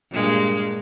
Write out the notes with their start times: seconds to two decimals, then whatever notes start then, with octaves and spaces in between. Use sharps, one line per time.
0.12 G2 A#2 G#3